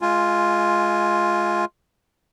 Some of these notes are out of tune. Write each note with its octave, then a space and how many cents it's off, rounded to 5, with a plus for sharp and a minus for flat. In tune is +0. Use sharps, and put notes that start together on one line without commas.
G#3 +20 F4 +0 G#5 +0